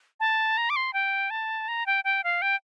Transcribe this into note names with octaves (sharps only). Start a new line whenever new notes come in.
A5
A#5
D6
C6
G5
A5
A#5
G5
G5
F5
G5